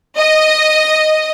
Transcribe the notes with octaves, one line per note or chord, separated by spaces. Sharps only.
D#5